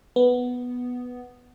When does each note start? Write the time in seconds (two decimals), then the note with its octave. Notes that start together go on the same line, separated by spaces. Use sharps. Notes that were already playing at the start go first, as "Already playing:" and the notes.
0.16 B3